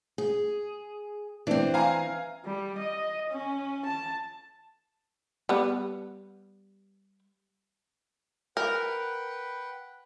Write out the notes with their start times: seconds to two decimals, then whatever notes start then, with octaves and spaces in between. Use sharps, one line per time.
0.18 G#4
1.47 E3 C4 D4
1.74 F5 G#5 A#5
2.45 G3
2.79 D#5
3.30 C#4
3.86 A5
5.49 G3 B3
8.57 A#4 B4 F#5 G5